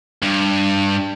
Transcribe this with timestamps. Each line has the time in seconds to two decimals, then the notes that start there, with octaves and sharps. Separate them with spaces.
0.22 G2